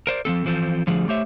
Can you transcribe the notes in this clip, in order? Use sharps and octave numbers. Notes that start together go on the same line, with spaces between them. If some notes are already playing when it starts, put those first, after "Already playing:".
A#4 C5 D5
F3 G#3 C4 A4
E3 F3 C4 A4
D3 F3 G3 A3 G#4
A3 G4 C5 C#5 E5